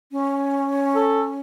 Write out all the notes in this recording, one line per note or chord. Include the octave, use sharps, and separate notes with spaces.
C#4
A4